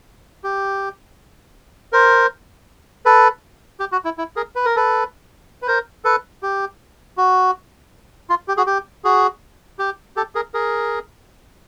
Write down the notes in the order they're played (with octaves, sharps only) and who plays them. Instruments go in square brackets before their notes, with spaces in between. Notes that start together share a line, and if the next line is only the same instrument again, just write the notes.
[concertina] G4
A#4 C5
A4 B4
G4
F#4
E4
E4
G#4 A#4
B4
A#4
A4 B4
B4
A#4 C5
A4 B4
G4
F#4
F4
G4
F#4 G#4
G4
F#4 G#4
G4
G4 A4
G#4 A#4
G#4 A#4